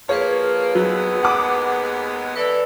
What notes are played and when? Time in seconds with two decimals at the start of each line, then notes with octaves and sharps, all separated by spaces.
0.09 F3 A#3 G#4 B4 C#5
0.75 D#2 F#3 G#3 B3
1.23 F#5 D6 D#6
2.36 E3 A4 B4 D5